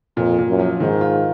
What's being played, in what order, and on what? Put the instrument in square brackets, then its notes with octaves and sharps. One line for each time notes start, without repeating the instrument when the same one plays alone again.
[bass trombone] F2 [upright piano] A#2
[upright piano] A#2
[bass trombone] F#2
[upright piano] F3
[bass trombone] G#2 [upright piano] D#3
[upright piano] F4